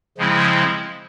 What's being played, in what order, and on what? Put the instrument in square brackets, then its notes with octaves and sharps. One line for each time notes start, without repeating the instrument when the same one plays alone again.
[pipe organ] C#3 F3 G#3 C4 E4